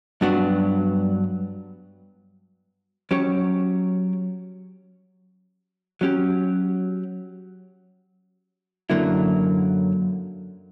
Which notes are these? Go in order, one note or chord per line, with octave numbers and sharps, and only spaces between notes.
G2 F#3 B3 D4 F#4
F#3 C#4 G4 C#5
F#3 C#4 G4
F#2 D3 F#3 A#3 E4